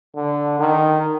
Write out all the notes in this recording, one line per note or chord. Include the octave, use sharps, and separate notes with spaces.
D3
D#3